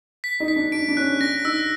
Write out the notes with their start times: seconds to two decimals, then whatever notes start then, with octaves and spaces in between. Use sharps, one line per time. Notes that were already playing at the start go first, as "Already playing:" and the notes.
0.24 B6
0.40 D#4
0.48 B6
0.56 D4
0.72 D4 D7
0.89 D4
0.97 C#4 F#6
1.20 D4 A#6
1.45 D#4 E6